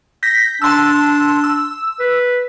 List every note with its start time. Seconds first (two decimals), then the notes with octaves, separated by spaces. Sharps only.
0.23 G6 A#6 B6
0.62 D4 A5 C6 E6
1.44 E6
1.99 B4